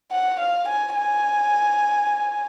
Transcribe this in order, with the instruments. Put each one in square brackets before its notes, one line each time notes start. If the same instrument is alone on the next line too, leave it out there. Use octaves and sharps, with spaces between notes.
[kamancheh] F#5
F5
G#5
G#5